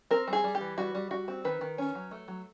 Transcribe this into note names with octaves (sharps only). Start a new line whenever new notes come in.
C4 A#4
G3
G#4
G3
G4
E3
G3 F#4
G3
G3 F#4
C4
D#3 B4
D#3
C#4
F#3
A3
F#3